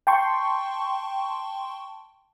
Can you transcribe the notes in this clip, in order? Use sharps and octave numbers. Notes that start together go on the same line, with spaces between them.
G5 A5 C6 C#6